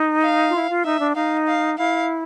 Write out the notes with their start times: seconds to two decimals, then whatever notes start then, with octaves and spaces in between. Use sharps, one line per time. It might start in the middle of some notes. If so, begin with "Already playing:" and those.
Already playing: D#4
0.23 F5
0.49 F4
0.54 E4
0.69 F4
0.85 D#4 E5
1.00 D4
1.16 D#4 F5
1.47 F5
1.78 E4 F5